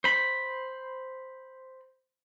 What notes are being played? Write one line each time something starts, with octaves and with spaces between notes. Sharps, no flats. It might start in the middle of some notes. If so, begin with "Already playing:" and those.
C5 B5